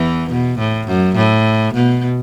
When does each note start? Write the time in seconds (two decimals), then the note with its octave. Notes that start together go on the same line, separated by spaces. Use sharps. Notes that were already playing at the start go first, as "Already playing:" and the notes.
Already playing: E2 E3
0.30 B2
0.59 A2
0.87 F#2
1.16 A2
1.74 B2